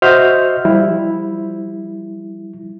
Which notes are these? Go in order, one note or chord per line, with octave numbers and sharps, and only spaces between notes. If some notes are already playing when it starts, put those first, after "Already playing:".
F#4 C5 D#5 E5 F6 G6
F3 G3 E4